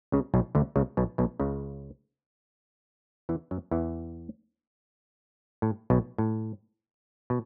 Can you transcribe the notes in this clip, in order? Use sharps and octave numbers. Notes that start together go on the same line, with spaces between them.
C#2 C#3
B1 B2
D2 D3
C#2 C#3
B1 B2
B1 B2
C#2 C#3
E2 E3
F#2 F#3
E2 E3
A2
B1 B2
A2
B2